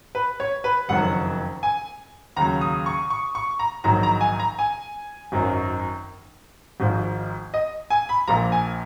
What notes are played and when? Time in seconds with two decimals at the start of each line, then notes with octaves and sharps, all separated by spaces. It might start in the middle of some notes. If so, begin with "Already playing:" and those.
0.15 B4
0.40 C#5
0.64 B4
0.89 F#1 F2 D#3 F#3 F#5
1.63 G#5
2.36 D#2 C#3 F#3 A#5
2.61 D#6
2.86 C#6
3.10 C#6
3.35 C#6
3.59 A#5
3.84 A#1 G#2 D#3 F#3 A#5
4.03 A#5
4.21 G#5
4.40 A#5
4.59 G#5
5.32 G#1 F#2 D#3 F#3
6.80 G#1 G#2 F3
7.54 D#5
7.90 G#5
8.09 B5
8.28 A#1 A#2 F3 A#5
8.52 G#5